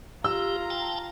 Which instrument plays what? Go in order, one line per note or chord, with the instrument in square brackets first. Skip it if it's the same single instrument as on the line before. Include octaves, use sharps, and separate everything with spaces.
[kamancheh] F4 A#5 [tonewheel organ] G4 [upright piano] E6
[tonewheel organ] G5 A5